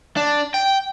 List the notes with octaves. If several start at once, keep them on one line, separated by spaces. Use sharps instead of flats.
D4
G5